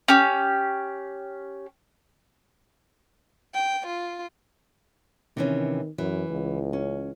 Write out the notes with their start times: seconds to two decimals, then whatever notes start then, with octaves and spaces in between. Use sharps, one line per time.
0.08 C#4 G4
3.55 G5
3.87 F4
5.37 C3 D#3 E3 C#4
5.98 F#2 E3
6.30 C#2
6.73 C#4